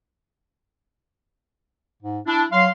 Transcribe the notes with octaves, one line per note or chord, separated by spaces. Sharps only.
G#2
D4 E4
F#3 F5 C6